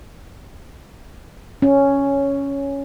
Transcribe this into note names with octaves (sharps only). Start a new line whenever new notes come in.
C#4